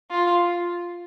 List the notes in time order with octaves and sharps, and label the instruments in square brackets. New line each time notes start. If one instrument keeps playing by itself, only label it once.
[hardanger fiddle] F4